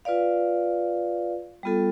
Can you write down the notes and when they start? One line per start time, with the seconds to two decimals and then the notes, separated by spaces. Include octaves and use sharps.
0.05 F4 B4 D5 F5
1.63 G3 B3 F4 A4